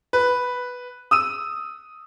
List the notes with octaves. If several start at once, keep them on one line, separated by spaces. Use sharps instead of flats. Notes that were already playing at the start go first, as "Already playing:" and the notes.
B4
D#6 E6 D#7